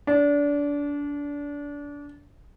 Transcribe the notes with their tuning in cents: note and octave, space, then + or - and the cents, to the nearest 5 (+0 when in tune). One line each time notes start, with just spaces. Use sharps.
D4 -25